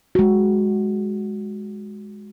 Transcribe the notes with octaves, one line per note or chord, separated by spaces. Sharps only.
G#3 F#4